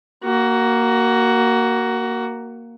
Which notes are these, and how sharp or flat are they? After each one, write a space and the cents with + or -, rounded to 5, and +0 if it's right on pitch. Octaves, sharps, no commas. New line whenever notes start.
A#3 +0 F#4 +20